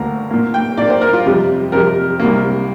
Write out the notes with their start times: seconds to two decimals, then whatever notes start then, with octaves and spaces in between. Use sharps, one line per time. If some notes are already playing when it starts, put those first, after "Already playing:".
Already playing: D2 D3 A#3 A#5
0.31 A#2 A#3
0.54 G5
0.77 A#2 A#3 D5
0.90 C5
1.01 A#4
1.13 F4
1.25 F2 C3 G3
1.72 F2 C3 G3 A#4
2.19 C2 C3 A#3